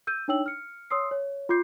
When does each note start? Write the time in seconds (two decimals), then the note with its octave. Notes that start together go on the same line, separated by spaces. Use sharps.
0.07 E6 G6 D#7
0.28 D4 D#4 C#5 G5 E6 F#7
0.46 F6 C#7
0.90 C#5 C6 D#6 E6 C7
1.11 C#5
1.49 F4 C6 D6 G6 C7